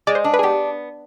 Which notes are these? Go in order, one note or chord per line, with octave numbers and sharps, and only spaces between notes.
G#3 D5
C5
D4
B4
G#4
B3 G4